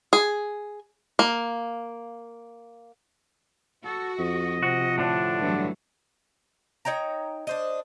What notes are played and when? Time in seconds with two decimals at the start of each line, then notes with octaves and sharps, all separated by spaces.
0.13 G#4
1.19 A#3
3.85 F#4 A4
4.19 F2 D#5
4.63 C3 F3 F#4
4.98 A2 D3 D4
5.41 G2 E3 F#3 A3
6.85 D#4 C#5 G5 A#5
7.47 D4 C5 D#5